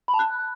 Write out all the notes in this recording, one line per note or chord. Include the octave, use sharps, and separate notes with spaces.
B5
A5
F#6